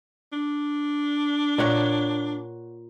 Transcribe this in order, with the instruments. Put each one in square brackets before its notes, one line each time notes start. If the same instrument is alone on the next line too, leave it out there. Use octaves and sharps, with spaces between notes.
[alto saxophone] D4
[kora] A#2 C#5 F#5